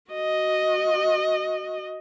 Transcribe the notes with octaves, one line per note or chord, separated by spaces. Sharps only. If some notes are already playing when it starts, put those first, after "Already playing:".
F#4 D#5